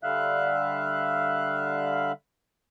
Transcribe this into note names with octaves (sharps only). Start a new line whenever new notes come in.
D3 G3 E5 F5 F#6